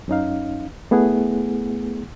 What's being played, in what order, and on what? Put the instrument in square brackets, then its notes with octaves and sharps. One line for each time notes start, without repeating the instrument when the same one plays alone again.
[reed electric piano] F#2 C#4 D#4 F5
A3 B3 E4 G#4 F#5